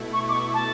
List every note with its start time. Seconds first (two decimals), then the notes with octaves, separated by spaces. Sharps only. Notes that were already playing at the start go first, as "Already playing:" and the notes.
Already playing: B2 A3 E4
0.13 C#6
0.29 D6
0.33 C#6
0.54 A5